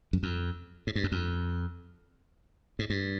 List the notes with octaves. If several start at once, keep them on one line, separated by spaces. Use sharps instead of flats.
F#2
F2
G#2
G2
F#2
F2
G#2
G2